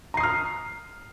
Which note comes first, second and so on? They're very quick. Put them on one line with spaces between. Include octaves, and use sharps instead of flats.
A#5 C7 D#6 F6